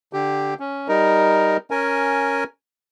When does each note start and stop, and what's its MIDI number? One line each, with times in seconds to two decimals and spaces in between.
0.13 0.54 50
0.13 0.54 67
0.60 0.88 61
0.88 1.57 55
0.88 1.57 63
0.88 1.57 70
1.71 2.44 61
1.71 2.44 70
1.71 2.44 80